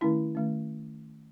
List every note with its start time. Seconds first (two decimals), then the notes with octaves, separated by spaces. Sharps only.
0.01 D#3 A3 C#4 E4
0.35 D#3 A3 C#4